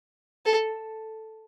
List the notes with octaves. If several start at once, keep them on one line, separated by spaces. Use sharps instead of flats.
A4